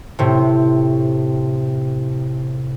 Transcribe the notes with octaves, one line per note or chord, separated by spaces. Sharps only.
A2 C3